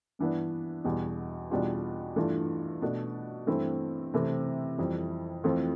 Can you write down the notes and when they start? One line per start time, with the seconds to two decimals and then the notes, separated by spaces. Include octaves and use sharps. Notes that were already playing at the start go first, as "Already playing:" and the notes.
0.19 G2 E3 B3 D4
0.84 E2 B2 G3
1.50 E2 B2 G3 D4 F4
2.16 G2 E3 A3 D4 F4
2.82 B2 A3 D4
3.47 G2 E3 A3 C4 E4
4.13 C3 E3 A3 C4 E4
4.78 F2 E3 G3
5.44 F2 E3 A3 C4 F4